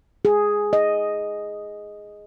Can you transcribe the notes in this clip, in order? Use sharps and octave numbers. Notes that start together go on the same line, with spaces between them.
G#4
D#5